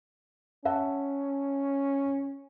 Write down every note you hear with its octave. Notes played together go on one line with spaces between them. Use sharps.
C#4 E5 F#5 A5